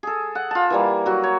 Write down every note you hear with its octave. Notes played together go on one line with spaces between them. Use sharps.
G#4 A4
F#5
F4 A5
E3 G3 A#3
F#3 F#4
C#5